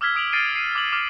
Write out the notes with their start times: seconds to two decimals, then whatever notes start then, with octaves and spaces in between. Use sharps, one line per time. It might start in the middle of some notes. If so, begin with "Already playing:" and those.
0.01 D6 E6 F6 G#6 B6 G7
0.15 D#6 D7 F7 F#7
0.33 F6 A6 C7 D7 D#7
0.56 C7 D#7
0.75 D6 F6 F#7
0.92 D6 F6